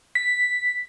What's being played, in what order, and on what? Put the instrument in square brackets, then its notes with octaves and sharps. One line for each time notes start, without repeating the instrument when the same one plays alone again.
[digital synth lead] B6